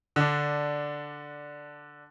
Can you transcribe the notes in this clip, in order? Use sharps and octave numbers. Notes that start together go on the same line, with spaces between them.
D3 D4